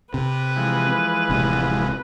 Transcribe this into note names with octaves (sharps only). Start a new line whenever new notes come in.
C3 B4
E3 F3 G#3
D1 C3